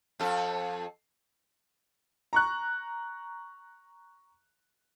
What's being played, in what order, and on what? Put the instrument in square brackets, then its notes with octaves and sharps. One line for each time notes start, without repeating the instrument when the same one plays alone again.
[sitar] F2 A4
[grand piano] A#5 C#6 F#6